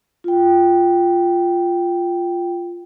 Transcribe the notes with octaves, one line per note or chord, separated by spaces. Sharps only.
F4 G5